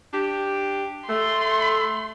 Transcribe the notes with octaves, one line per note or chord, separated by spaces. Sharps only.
D4 G4
A3 C6